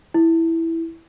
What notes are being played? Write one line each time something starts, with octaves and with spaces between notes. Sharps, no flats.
E4